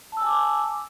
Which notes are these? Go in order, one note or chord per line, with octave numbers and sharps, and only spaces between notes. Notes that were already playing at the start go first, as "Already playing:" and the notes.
G#5 A5 D6 E6